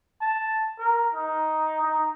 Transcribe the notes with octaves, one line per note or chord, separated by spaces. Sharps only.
A5
A#4
D#4
D#4